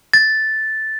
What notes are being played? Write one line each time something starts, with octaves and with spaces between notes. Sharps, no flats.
A6